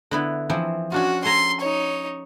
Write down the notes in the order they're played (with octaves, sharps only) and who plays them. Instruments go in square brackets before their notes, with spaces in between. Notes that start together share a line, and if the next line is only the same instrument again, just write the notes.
[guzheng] D3 B3 E4
E3 F3 C4
[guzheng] C#4 D4 F4 [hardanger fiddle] F#4
[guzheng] A4 G#5 A#5 [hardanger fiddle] C6
[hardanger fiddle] D#4 C#5